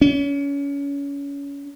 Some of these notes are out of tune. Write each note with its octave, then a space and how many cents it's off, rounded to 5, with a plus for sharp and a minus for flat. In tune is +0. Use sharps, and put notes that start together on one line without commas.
C#4 +30